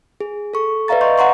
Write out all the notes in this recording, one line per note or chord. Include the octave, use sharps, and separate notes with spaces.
G#4
A4 C#6
B4 D5 E5 F5 A#5 A6
D#5 C6 C#6 G6
F#5 A#5 C6 C#6